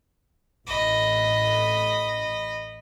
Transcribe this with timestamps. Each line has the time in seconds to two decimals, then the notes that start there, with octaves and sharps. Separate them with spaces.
0.67 A1 A2 D#5 B5